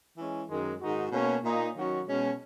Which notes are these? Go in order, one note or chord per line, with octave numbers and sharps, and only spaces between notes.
E3 G#3 C#4
F#2 D#3 G#3
G#2 D#3 G#3 D#4 F#4
B2 A#3 C#4
A#2 A#3 D#4
D#3 F#3 C#4 F#4
B2 G#3 C#4